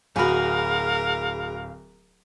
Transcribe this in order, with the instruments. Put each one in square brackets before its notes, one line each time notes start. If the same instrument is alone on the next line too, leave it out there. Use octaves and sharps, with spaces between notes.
[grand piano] D1 B5 [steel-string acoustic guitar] F#4 G#4 [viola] A#4 [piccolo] F5